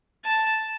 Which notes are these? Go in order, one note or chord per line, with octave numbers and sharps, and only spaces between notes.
A5